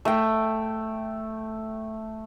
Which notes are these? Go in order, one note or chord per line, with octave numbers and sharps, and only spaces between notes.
A3 G5